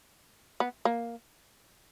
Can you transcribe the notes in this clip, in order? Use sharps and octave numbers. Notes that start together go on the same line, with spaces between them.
B3
A#3